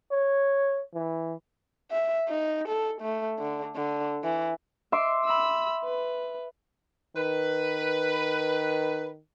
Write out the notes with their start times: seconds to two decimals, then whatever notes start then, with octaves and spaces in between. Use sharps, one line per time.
0.11 C#5
0.94 E3
1.91 E5
2.28 D#4
2.68 A4
3.01 A3
3.39 D3
3.76 D3
4.24 E3
4.92 E5 C6 D6
5.25 B5 E6
5.85 B4
7.17 D#3 B4